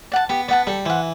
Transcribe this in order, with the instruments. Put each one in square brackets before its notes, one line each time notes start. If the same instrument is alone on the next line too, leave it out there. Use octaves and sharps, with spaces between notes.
[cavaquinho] D5 F#5 A5
[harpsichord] B3 [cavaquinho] G4
[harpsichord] B3 [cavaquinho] D5 F#5 A5
[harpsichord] G3 [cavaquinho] A4
[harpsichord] E3 [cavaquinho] C5 F#5